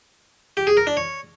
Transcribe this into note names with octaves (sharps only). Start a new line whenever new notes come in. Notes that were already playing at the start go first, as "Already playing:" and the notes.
G4
G#4
A#4
D4
C#5